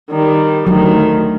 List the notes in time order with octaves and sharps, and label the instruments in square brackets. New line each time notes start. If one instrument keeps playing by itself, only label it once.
[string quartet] D#3 G3
[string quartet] D2 D#3 [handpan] F#3